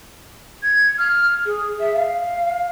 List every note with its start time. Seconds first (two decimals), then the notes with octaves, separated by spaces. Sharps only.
0.63 G#6
0.98 F6
1.45 G#4
1.80 E5
1.94 F5